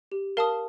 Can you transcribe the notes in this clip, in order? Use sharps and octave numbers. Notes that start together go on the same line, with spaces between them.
G4
A#4 F5 A5 D#6